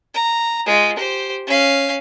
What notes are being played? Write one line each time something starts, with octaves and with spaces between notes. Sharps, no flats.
A#5
G#3 F4
G4 C5
C#4 F5